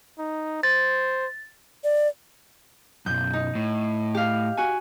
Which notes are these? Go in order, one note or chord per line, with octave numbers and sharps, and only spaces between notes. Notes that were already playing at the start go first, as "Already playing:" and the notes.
D#4
C5 A6
D5
B1 F#2 G6
D#4
A2
G4 F5
F#4 G#5